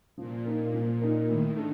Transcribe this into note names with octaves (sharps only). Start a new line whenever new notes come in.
A#2 F3
A#3 D#4
F3
A#3 D#4
A2 D#3
D4 A4